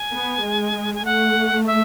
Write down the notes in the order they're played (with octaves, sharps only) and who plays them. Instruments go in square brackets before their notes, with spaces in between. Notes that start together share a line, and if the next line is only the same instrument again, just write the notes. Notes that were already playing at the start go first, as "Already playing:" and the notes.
Already playing: [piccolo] G#5
[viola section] B3
G#3
[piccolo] G#5
[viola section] A3 [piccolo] F#5
[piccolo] E5